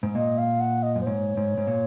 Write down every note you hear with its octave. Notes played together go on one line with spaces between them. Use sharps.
G#2
A#2 D#5
F5
F#5
D#5
F#2
C5
G#2 C#5
G#2
G#2
A#2